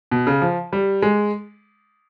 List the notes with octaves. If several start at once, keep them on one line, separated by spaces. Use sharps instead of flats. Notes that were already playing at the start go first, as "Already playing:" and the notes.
B2
C#3
F3
G3
G#3